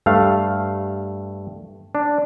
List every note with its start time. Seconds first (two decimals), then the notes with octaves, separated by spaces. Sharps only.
0.06 G2 A3 F5
1.95 D4